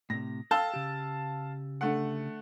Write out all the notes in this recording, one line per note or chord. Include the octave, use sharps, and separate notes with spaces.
A2 C3 A#6
A4 F5 G5 A5 E6
C#3 G4
D3 A3 F#5